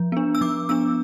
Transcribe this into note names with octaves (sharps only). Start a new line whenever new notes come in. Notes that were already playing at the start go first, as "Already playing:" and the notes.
Already playing: F3
B3 D4
E6
F3 D6
B3 D4 E6